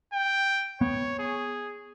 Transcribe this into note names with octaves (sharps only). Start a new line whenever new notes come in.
G5
B3 C#5
G#4